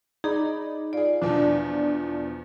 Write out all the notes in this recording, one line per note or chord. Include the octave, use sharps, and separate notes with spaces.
D#4 G#4 D5 B5
F4 G#4 D5
E2 B2 F3 D4